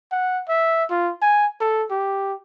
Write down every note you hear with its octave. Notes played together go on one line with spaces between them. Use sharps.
F#5
E5
F4
G#5
A4
G4